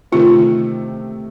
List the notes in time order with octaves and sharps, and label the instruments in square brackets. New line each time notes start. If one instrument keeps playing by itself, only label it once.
[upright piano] C3 D#3 A3 C4 [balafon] F4